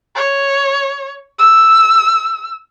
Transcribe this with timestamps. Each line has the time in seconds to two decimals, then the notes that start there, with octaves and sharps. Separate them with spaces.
0.16 C#5
1.39 E6